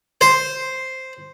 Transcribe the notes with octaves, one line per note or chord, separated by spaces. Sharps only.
C5